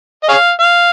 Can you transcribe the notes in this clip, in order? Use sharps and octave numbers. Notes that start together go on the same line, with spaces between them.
D#5
G#4 C#5 F5
F5